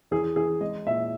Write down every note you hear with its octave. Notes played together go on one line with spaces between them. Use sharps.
E2 G#4
E2 G#4
G#3 D#5
A#2 E5